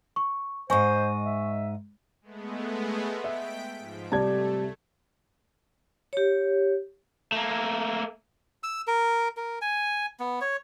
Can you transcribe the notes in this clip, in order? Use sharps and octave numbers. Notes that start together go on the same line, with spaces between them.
C#6
G#2 C5 D#5 G#5 C#6
E5
G#3 A3 B3
E5 G5 B6 D7
G#2 F3
C3 G3 A3 D5 A5 G#6
G4 C#5
A3 A#3
E6
A#4
A#4
G#5
B3
C#5